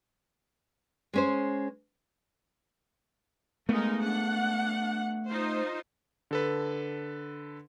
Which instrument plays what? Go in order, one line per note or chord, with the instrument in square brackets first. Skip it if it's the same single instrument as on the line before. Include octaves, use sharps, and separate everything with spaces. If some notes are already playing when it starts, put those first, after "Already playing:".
[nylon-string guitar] G#3 C#4 C5
[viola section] G#3 D#4 A#4 [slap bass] A3 B3
[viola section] D4 F#5
D#4 F4 C5
[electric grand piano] D3 A4 B4